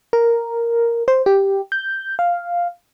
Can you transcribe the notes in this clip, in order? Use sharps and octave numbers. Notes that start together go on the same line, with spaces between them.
A#4
C5
G4
G6
F5